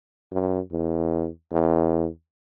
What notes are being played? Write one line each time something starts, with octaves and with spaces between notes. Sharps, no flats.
F#2
E2
E2